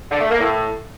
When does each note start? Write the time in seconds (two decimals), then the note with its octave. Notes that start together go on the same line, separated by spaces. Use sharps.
0.11 D3
0.20 A3
0.30 A#3
0.40 A2